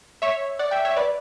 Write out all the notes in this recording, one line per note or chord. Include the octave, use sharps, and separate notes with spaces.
C#5 E5
D5 F#5
E5 G5
C#5 E5
B4 D5